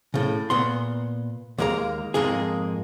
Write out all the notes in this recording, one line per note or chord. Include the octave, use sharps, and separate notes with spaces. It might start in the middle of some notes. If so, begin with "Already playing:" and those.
A2 C#3
A#2 B3 C6
D#2 G#3 A#3 A#4 A#5
F2 G#2 G#3 A#3 G#4